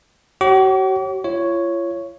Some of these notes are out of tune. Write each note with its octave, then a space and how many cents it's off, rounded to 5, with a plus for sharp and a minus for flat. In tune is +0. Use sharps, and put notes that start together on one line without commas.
F#4 +45 C#5 -20 D6 -40
F4 -40 C#5 +0